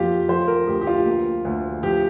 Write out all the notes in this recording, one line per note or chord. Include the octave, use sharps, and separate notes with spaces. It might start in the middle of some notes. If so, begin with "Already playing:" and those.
Already playing: F2 A#3 F4 G4
F3 C5
A#4
D2 G4
G4
F4
A#3
D2
F3 G4